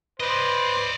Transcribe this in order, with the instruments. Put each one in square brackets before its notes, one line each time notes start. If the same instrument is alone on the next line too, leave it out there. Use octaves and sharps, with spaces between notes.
[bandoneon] B4 [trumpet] C5 [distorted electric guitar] D5 D#5